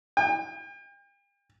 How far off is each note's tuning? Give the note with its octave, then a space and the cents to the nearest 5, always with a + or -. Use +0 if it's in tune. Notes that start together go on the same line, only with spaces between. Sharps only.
G5 +40